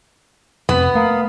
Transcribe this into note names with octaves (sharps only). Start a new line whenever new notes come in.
F2 C3 B3
A3 A#3 A#4 F5 D#6